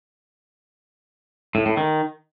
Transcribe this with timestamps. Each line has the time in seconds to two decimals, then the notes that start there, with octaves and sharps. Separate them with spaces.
1.55 A2
1.66 A2
1.77 D#3